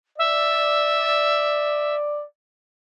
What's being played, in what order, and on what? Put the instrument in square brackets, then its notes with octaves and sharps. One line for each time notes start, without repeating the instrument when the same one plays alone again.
[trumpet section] D5 [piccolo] E5